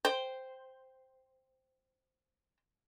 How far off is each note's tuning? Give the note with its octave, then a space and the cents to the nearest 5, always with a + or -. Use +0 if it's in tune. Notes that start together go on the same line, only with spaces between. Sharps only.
C5 +0 G5 +0